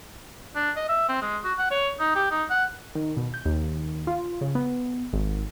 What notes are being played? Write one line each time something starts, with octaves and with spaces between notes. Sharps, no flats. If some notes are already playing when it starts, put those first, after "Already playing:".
D4
D#5
E5
C4
G#3
F#4
F#5
C#5
D#4
G4
D#4
F#5
D#3
B2
G6
D#2
F4
C#3
B3
G#1